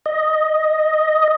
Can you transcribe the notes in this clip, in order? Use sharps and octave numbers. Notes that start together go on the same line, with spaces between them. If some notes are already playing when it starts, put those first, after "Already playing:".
D#5